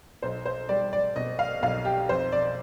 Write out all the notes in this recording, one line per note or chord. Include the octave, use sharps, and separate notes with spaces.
B1 C5
C5
G3 D5
D5
B2 D#5
F5
B1 F5
G4
F2 C5
D5